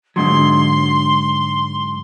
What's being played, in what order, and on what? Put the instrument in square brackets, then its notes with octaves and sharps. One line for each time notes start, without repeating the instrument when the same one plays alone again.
[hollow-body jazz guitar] G#2 D3 F#3 [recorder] C6